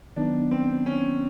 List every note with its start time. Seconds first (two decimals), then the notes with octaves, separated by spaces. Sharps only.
0.16 D#3 F#3 B3 D4 D#4
0.51 C4
0.86 C#4